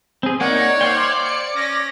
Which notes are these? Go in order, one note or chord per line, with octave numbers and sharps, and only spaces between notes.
C4 G#4
A#3 D#4 C#5 D5 F#5
C5 F5 G5 C6
C#7
C#4 A#6